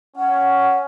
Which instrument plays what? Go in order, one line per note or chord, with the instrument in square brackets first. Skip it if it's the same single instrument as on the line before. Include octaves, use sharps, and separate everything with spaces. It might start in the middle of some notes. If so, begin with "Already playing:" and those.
[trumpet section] C#4 [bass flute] F#5